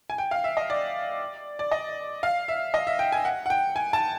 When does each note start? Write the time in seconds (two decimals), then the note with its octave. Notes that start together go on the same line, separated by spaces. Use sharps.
0.10 G#5
0.18 G5
0.31 F5
0.44 E5
0.57 D#5
0.70 D5
1.59 D5
1.71 D#5
2.23 F5
2.48 E5
2.74 D#5
2.87 E5
2.99 G5
3.12 G#5
3.25 F#5
3.46 F#5
3.50 G5
3.76 G#5
3.93 A5